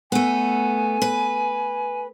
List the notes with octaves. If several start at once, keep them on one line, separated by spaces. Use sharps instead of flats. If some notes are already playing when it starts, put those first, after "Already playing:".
A3 B3 G#5
B4